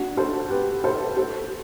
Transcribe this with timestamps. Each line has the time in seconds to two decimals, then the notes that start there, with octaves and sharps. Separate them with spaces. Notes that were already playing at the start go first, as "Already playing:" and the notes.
Already playing: D4 F#4
0.17 A4 C5
0.50 G4 B4
0.84 A4 C5
1.17 A4 C5